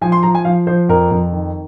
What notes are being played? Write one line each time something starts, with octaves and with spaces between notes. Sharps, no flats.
F3 G#5
C6
F3 A#5
G#5
F3 F5
F3 C5
F2 A#4
F2
D#3